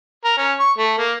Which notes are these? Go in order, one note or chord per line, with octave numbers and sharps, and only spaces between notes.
A#4
C#4
C#6
A3
A#3